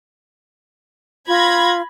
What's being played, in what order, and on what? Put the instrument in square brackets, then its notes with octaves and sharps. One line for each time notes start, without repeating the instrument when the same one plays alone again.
[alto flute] F4 [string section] B5 G#6 A#6